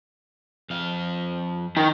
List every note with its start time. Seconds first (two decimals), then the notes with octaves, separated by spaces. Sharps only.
0.70 F2 F5
1.77 D#3